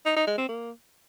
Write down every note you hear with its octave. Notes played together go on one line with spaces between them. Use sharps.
D#4
D#4
G#3
C4
A#3